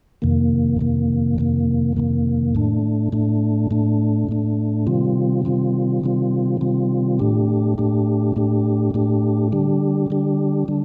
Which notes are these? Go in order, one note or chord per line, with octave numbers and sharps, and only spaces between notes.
F2 C3 D#3 A#3
F2 C3 D#3 A#3
F2 C3 D#3 A#3
F2 C3 D#3 A#3
A2 A3 D4
A2 A3 D4
A2 A3 D4
A2 A3 D4
C3 D#3 G3 C4 F4
C3 D#3 G3 C4 F4
C3 D#3 G3 C4 F4
C3 D#3 G3 C4 F4
A2 A3 D4 G4
A2 A3 D4 G4
A2 A3 D4 G4
A2 A3 D4 G4
D3 G3 D4 G4
D3 G3 D4 G4
D3 G3 D4